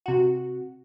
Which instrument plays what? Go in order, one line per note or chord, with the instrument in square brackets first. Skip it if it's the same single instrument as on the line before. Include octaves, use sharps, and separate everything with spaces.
[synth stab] C3 F#4